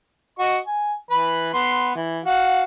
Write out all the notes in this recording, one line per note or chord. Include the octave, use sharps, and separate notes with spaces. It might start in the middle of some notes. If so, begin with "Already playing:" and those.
F#4 D#5 C#6
G#5
E3 B4 B5
B3 C6
E3
F#4 F5 F#5